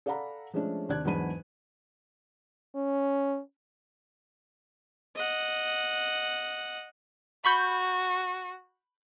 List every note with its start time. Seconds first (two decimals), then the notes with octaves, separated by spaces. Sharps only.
0.06 A4 D5 F5 F#5 A#5 B5
0.54 F3 G#3 A3 C#4 D4
0.89 D#2 C3 D4 D5 F#6 G#6
1.05 E2 G#2 F#3 D4 B5 D#7
2.76 C#4
5.16 D#5 F#5
7.45 F#4 B5 C#6 G6